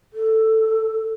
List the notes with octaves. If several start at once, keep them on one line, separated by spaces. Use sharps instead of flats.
A4